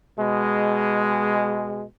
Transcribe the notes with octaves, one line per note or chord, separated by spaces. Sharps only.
B2 G#3